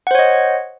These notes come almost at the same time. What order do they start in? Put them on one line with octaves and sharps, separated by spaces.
F#5 C5 C#5 D#5